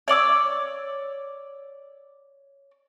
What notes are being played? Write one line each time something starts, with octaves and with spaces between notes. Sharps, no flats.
C#5 D5 D6 E6